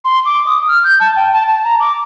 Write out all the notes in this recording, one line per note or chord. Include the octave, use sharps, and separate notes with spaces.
C6
D6
D#6
F6
G6
A5
G5
A5
A5
A#5
D6